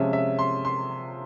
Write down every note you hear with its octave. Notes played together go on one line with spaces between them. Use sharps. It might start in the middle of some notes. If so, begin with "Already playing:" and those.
Already playing: C3 F3 G#3 C#4 E5
E5
C6
C6